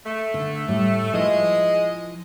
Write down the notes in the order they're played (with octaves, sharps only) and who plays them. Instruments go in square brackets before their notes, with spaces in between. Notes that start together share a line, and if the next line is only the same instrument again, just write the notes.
[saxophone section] A3
[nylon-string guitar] D3
A2 G3
[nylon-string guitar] F3 E4 B4 [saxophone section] G#3 D#5